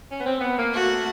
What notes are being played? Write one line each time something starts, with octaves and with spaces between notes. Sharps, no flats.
C#4
B3
C4
B3
A#3
A3 F#4